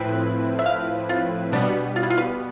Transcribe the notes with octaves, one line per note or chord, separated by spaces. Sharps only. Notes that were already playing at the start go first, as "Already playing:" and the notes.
Already playing: A2 F3 C4 E4 B4 G5
E5
F5
F4
B2 G3 B3 D4
F4
E4
F4
B4